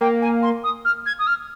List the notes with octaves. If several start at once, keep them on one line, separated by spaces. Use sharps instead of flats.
A#3 G5
G#5
C6
D#6
F6
G#6
D#6
F6